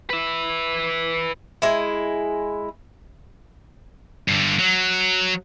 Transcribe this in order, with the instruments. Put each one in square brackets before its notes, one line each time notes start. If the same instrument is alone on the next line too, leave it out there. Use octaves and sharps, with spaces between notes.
[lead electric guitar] B4 E5
[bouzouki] G#3 E4
[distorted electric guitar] G2 D3
F#3